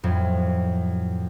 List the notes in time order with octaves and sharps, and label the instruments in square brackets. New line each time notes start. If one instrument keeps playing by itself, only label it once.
[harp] F2 A2 F#3